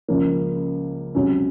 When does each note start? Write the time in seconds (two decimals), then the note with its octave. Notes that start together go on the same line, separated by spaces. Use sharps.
0.08 C#2 C#3 F3 A#3
1.15 C#2 C3 F#3 C#4